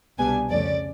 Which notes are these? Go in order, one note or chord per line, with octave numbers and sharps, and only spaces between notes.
C2 B2 G3 B3 D4 G#5
F2 C#3 F3 A3 C#4 D5